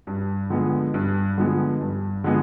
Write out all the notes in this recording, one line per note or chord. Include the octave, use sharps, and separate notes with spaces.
G2
D3 F3 G#3 B3
G2
D3 F3 G#3 B3
G2
D3 F3 G#3 B3